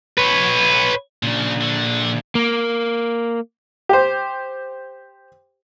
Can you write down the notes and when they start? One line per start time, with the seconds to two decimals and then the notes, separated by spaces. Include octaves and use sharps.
0.18 B4 C#5
1.23 A#2 C#3 D4
1.61 D3
2.35 A#3
3.89 G4 C5